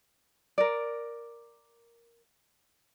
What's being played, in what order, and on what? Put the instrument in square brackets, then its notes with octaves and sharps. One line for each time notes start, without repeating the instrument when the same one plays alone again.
[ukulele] A#4 D5